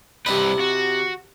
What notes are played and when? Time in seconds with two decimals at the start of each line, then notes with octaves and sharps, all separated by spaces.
0.26 C2 C3 E4 B4 D#5
0.60 F#4